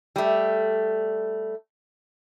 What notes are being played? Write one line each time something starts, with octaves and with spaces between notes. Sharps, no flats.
G3 A3